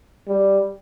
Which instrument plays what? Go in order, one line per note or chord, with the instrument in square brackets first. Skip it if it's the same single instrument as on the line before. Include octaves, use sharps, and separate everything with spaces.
[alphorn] G3